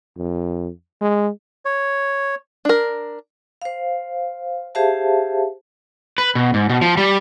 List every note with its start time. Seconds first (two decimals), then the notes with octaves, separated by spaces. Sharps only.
0.17 F2
1.01 G#3
1.65 C#5
2.65 D4 A#4
3.62 C5 F5
4.75 G4 G#4 C5 E5 F5 A5
6.18 B4
6.35 B2
6.54 G#2
6.70 B2
6.81 F3
6.97 G3